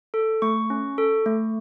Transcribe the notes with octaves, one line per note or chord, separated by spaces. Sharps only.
A4
A3 C#6
C#4
A4
A3